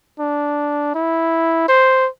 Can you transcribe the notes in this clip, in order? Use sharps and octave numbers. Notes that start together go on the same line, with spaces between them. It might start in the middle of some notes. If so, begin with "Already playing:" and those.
D4
E4
C5